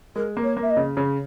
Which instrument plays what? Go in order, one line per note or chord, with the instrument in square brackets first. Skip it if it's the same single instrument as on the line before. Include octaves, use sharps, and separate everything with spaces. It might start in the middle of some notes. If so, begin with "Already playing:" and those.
[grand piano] G#3 [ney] A#4
[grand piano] A#3
[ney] C#5
[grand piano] A#3
[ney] E5
D#5
[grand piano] C#3
C#3